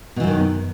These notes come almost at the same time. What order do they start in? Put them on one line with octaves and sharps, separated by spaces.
B2 E3 F#2 D#3